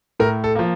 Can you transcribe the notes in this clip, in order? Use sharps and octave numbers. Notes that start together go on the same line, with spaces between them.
A2 A#4
A4
F3 A#3